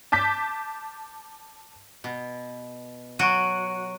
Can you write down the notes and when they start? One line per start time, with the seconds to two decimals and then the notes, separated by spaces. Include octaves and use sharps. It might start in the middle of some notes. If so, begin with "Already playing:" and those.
0.12 A5 D6 G6 B6
2.04 B2
3.19 F#3 F#4 C#6 D7 D#7